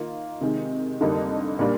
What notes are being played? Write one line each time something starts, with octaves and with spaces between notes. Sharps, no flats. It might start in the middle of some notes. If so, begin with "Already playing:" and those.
Already playing: D#3 A#3 F4
C3 D#3 G#3
F2 D3 G3 A#3 D#4
A#2 G3 A#3 D4